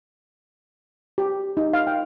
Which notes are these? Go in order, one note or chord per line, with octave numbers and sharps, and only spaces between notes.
G4
D#4
F5
G5